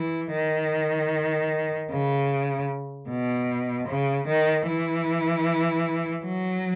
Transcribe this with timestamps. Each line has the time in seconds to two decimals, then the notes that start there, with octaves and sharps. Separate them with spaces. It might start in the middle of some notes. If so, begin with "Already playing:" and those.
Already playing: E3
0.32 D#3
1.91 C#3
3.09 B2
3.88 C#3
4.27 D#3
4.67 E3
6.25 F#3